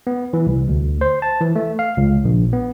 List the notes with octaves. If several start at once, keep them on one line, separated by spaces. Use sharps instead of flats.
B3
E3
C2
D2
C5
A5
E3
A3
F5
C#2
A#1
B3